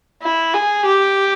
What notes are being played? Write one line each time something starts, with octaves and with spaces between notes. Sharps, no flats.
E4
G#4
G4